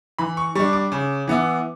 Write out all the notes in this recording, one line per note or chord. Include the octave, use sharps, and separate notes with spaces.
E3 B5
C#6
G3 D4 C#6
D6
C#3
E3 B3 E4